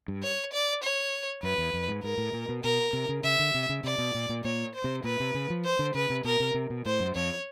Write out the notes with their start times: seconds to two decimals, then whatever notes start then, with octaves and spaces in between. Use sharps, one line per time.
0.08 G2
0.23 C#5
0.52 D5
0.83 C#5
1.43 F#2 B4
1.58 E2
1.73 F2
1.88 G#2
2.03 G#2 A#4
2.18 A2
2.33 A#2
2.49 B2
2.64 B2 A#4
2.93 C3
3.09 C#3
3.24 C#3 E5
3.39 D3
3.54 C3
3.69 C#3
3.84 C3 D5
3.98 B2
4.15 A#2
4.29 A#2
4.44 A#2 C#5
4.75 C5
4.84 C3
5.04 A#2 B4
5.20 C3
5.35 C#3
5.50 F3
5.65 C5
5.79 D3
5.95 C#3 B4
6.10 C3
6.25 B2 A#4
6.40 C3
6.54 C3
6.70 B2
6.85 A2 C5
7.00 F#2
7.15 F2 C#5